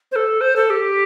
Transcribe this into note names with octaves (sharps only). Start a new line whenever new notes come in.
C5
A4
C5
A4
G4